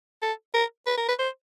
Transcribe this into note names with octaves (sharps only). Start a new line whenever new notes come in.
A4
A#4
B4
A#4
B4
C5